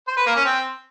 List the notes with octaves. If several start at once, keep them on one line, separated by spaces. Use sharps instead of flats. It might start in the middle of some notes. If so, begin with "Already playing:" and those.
C5
B4
A#3
C#4
C4